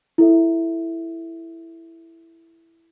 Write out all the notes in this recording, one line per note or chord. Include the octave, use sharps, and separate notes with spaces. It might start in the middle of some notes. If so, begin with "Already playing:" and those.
E4 A4 E5